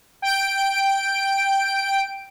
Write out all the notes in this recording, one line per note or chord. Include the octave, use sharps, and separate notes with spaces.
G5 D7